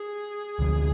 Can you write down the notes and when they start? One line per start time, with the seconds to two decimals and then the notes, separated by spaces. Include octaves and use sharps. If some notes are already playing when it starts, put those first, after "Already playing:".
Already playing: G#4
0.59 D2 C3 F3